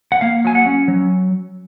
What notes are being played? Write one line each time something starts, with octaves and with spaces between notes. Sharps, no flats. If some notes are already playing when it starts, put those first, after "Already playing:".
F#5
A#3 F5
F#3 G#5
F#5
C#4
F#3